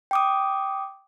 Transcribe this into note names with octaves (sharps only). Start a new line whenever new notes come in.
G5 D6 D#6